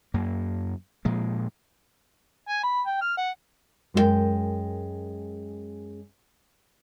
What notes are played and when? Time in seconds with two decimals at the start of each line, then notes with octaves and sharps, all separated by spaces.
0.14 F#2 A#3
1.05 A#2 F3 G#3
2.49 G#5
2.63 B5
2.86 G5
3.01 F6
3.18 F#5
3.94 F#2 G#3 F#4 A#4 G5